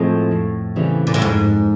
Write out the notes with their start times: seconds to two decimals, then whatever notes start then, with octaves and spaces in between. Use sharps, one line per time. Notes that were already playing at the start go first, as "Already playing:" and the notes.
Already playing: A2 F3 G#3 C4
0.31 F2
0.76 C#3 E3 G3 C4
1.07 A#2
1.14 A2
1.22 F2 G#2